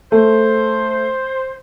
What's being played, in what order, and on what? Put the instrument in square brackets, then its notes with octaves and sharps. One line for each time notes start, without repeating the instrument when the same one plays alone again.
[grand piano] A3 [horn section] C5